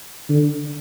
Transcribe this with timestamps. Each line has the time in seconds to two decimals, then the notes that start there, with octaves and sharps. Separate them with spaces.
0.29 D3